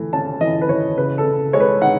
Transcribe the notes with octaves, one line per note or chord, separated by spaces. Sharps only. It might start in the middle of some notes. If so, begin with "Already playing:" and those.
Already playing: E3 A3
C#4 A5
E3 D#5
B4
E3 C#5
C#3 B4
A4
C#3
G#3 C#5
B4
D#4 F#5